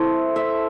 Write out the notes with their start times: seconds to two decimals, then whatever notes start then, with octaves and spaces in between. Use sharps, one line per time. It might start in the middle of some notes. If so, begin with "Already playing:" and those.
Already playing: A3 C4 E4
0.36 E5